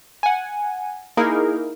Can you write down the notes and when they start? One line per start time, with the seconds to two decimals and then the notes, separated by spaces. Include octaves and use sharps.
0.23 F#5 G#5
1.17 A#3 D#4 E4 G#4 A#4